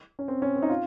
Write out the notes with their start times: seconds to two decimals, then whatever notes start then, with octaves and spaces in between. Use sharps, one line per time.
0.19 C#4
0.28 C4
0.42 C#4
0.56 C4
0.62 D#4
0.69 F4